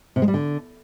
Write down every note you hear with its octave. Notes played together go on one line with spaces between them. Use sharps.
C3
G#3
G3
D3